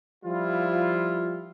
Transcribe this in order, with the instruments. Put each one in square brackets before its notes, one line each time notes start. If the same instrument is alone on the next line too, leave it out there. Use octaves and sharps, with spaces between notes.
[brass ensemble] F3 G3 E4 F4